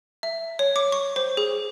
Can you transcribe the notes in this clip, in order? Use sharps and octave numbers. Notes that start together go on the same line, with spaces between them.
E5
C#5
D6
C#6
C5
G#4